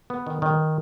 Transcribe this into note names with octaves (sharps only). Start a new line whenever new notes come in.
B3
D#3
D#3